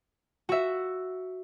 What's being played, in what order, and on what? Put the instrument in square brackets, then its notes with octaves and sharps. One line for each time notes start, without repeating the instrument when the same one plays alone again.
[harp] F#4 E5